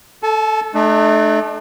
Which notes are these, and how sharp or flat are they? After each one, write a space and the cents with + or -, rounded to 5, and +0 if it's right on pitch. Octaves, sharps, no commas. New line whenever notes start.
A4 +0 A5 -40
A3 -25 D4 +45